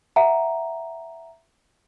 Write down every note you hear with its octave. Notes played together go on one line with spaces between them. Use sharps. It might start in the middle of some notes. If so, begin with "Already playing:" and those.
E5 F#5 A#5